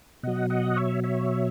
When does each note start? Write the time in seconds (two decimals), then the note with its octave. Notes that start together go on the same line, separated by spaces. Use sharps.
0.23 B2 F#3 D#5 F#5
0.50 D#5 F#5
0.77 C#5 E5
1.04 C#5 E5